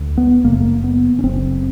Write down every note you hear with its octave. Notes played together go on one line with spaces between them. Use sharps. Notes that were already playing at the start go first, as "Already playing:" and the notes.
Already playing: D2 D3
B3
F#1 F#2 C#3 A#3
A3
A#3
B3
C#4
F#1 F#2 C#3 C4